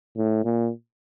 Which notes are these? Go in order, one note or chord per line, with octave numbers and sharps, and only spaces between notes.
A2
A#2